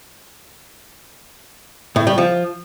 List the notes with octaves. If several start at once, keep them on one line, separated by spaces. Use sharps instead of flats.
A2
G3
F3